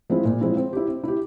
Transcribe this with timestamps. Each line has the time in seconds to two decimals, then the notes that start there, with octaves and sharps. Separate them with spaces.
0.10 F3 G#3 C4 E4
0.25 A#2
0.41 F3 G#3 C4 E4
0.57 C4
0.73 E4 G4
0.88 C4
1.04 E4 G4